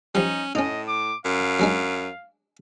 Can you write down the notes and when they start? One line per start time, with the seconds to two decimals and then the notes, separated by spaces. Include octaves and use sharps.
0.15 F3 G3 C#4 D#4
0.55 A2 C#4 D#4 D#5
0.88 D6
1.25 F#2 F5
1.59 F#3 G#3 D4